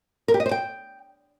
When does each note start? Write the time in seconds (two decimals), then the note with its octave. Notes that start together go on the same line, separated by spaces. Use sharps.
0.28 A#4
0.34 G4
0.40 D#5
0.46 C5
0.51 G5